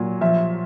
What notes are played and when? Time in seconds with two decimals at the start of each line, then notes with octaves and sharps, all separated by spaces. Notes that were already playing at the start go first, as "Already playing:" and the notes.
Already playing: A#2 F#3
0.21 F3 E5